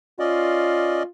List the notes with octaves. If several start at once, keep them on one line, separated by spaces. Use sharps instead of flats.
C#4 F4 D5 D#5